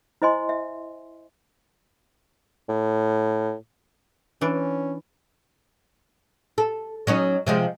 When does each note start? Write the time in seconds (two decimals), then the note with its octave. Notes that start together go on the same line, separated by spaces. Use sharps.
0.22 E4 C5 D#5 G#5 C6
0.49 E5
2.69 A2
4.41 E3 C#4 D4
6.58 A4
7.07 F#3 C#4 D#4
7.47 C3 F3 G#3